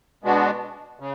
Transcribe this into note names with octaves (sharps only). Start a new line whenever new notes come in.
B2 G#3 B3 D4 F#4
C#3